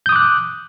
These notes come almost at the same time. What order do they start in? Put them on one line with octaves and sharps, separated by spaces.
G6 D#6 D6 F#6